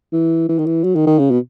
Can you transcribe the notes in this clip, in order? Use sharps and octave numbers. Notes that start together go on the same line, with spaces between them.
E3
E3
D#3
E3
F#3
D#3
D#3
C#3
B2